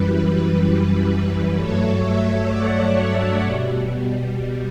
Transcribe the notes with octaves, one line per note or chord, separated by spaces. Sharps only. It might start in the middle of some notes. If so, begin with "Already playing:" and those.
Already playing: F#2 E3 G3 B4
B4
G2 F#3 A3 A4 C#5
C#5 E5
D5 F#5
B2 G3